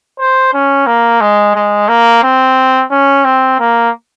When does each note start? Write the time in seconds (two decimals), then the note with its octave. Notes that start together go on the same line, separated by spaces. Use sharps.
0.19 C5
0.53 C#4
0.87 A#3
1.21 G#3
1.56 G#3
1.89 A#3
2.23 C4
2.91 C#4
3.25 C4
3.59 A#3